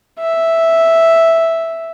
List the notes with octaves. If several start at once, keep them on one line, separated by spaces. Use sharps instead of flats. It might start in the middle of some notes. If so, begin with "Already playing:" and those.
E5